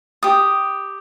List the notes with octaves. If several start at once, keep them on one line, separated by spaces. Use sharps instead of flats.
G4 D#6